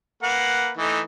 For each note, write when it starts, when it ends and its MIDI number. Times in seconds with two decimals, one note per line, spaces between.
0.23 0.71 58
0.23 0.71 71
0.23 0.71 78
0.77 1.00 52
0.77 1.00 57
0.77 1.00 63